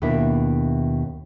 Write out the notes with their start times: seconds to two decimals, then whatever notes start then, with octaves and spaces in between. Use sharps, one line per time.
0.02 D#2 B2 D4 E4 E5